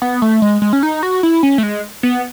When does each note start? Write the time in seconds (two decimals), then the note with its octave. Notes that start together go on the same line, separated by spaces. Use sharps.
0.02 B3
0.22 A3
0.42 G#3
0.62 G#3
0.73 C#4
0.83 D#4
1.03 F#4
1.23 E4
1.43 C#4
1.58 A3
1.63 G#3
2.03 B3